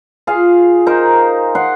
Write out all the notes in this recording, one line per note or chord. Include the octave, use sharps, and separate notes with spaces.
F4 G#4 F5
D#4 A#4 C5
F#5 C6